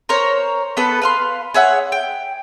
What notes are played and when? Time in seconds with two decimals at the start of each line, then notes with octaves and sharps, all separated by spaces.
0.09 A#4 C5 C#5 A#5
0.77 B3 A4 B4
1.02 B4 F5 C6
1.54 G#4 C#5 E5 F#5
1.92 G5